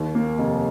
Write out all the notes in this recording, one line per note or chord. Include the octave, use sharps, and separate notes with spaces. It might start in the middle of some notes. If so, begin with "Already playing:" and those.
Already playing: D#2
A#3
F1